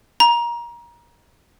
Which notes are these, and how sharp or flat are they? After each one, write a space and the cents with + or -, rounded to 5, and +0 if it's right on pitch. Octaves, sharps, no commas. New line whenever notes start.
A#5 +25